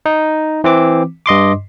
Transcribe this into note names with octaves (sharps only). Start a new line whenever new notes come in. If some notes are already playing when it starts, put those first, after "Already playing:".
D#4
E3 C4 D6
G2 D#5 C6 D6